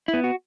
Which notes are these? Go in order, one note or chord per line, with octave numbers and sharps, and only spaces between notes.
E4
B3
F#4